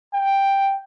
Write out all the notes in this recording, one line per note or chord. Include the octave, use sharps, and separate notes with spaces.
G5